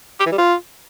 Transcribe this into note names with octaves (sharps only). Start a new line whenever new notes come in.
G4
E3
G3
F4